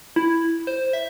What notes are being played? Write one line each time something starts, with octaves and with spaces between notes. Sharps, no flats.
E4
C5
E5